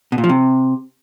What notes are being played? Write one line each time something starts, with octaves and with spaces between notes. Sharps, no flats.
B2
A#2
F3
C3